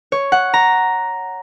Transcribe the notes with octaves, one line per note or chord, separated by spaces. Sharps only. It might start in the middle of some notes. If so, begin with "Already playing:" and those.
C#5
F#5
A#5